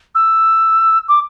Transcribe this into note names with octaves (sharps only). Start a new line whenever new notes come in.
E6
D6